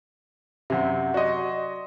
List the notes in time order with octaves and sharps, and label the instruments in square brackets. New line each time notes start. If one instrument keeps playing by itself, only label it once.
[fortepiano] F#2 C3 [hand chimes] E5 F#5
[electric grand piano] F#4 D#5 [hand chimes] D5 C6